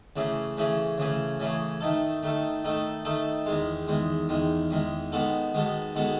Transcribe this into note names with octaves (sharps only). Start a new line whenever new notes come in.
C#3 E3 A3 C#4 G#4
C#3 E3 A3 C#4 G#4
C#3 E3 A3 C#4 G#4
C#3 E3 A3 C#4 G#4
D#3 A3 D#4 A4
D#3 A3 D#4 A4
D#3 A3 D#4 A4
D#3 A3 D#4 A4
E2 D#3 G#3
E2 D#3 G#3
E2 D#3 G#3
E2 D#3 G#3
D#3 G#3 B3 F#4 A4
D#3 G#3 B3 F#4 A4
D#3 G#3 B3 F#4 A4